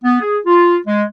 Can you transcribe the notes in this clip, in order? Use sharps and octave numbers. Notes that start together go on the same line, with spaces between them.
B3
G#4
F4
G#3